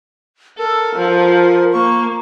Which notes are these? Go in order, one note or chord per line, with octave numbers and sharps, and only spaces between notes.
A4 A#4
F3
A#3 C#6